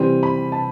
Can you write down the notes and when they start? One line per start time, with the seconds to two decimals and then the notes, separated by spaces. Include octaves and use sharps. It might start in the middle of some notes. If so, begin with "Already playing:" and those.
Already playing: C3 E3 G3 C4
0.23 B5
0.52 A5